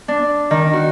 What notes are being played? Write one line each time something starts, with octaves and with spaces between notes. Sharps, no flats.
D4
D#3
F#4